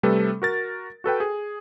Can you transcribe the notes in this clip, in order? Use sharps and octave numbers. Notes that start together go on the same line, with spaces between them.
C3 G3 A3 A4 B4
F#4 A#4 A6
F#4 A4 B4 G5
G#4